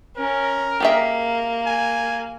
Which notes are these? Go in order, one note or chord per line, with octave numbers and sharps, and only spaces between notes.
C#4 A#4
A#3 G4 G#4 E5
G#5